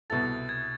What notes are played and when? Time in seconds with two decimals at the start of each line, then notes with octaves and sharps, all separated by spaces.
0.10 C2 B2 B3 E4 A4 A6
0.49 G#6